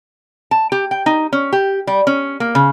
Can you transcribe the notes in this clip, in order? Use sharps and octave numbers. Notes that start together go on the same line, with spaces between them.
A5
G4
G5
D#4
C#4
G4
G3
C#4
A#3
C#3